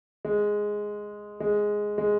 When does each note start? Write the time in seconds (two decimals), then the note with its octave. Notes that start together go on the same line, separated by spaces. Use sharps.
0.25 G#3
1.40 G#3
1.98 G#3